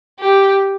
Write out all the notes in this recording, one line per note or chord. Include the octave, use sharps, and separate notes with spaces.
G4